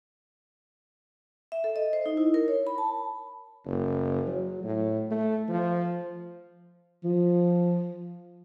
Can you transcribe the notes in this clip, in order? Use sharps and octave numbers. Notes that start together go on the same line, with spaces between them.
E5
A4
D#5
C5
D#4
E4
A#4
C#5
B5
A5
F#1
F#3
A2
A3
F3
F3